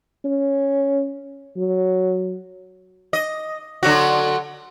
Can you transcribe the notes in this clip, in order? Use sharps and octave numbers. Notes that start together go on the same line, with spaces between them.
C#4
F#3
D#5
D3 F#3 F#4